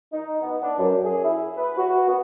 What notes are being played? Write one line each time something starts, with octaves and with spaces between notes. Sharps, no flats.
D#4
B3
D4
F#2
G#4
E4
B4
F#4
B3